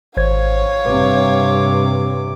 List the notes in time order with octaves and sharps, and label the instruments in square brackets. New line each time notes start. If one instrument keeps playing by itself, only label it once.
[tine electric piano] G#1 C5 G#6 [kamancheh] C#5 F5
[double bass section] G2 C3 [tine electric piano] B4 [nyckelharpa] D6